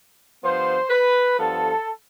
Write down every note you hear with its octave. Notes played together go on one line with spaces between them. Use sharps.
G2 F3 B3 C5
B4
G2 F3 B3 A4